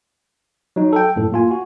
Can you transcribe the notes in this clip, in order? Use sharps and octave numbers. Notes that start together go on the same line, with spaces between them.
F#3 D#4
A4 G5
F#2 A2 A4
A#3 F4 G#5
F#4